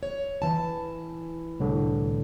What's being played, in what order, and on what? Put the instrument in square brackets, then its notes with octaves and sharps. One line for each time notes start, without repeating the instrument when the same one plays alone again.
[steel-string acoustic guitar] C#5
E3 A5
[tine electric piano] C2 A2 D3